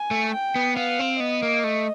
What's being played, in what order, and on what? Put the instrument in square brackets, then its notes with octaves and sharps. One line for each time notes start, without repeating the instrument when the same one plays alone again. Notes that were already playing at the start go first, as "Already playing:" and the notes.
Already playing: [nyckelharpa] G#5
[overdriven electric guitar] A3
[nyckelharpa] G5
[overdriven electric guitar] B3
[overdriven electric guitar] B3 [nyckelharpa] F5
[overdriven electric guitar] C4
[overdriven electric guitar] B3 [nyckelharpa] D#5
[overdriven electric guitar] A#3
A3